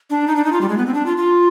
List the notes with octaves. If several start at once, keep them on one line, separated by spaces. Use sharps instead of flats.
D4
D#4
D4
D#4
F4
G3
G#3
B3
C4
D4
F4
F4